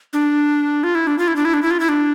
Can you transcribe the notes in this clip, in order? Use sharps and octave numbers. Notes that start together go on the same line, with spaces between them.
D4
F4
E4
D4
F4
E4
D4
E4
D4
E4
F4
E4
D4